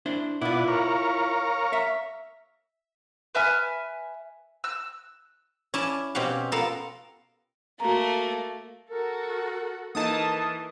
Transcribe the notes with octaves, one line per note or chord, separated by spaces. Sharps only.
D4 E4 C5
B2 E4 F4 D5 F#5
A#4 C#5 F5
E5
B4 E5 G#5 F6
E6 F#6
C#4 E4 D5 G#5 A5
B2 C4 C#4 G4 F5 F#5
B3 F4 A4 A#4 F5
A3 A#3 F#4 A#5
F#4 A4 A#4
E3 A#3 D#4 A4 A#4 A5 D#6